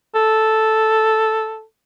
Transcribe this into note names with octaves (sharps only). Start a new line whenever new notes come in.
A4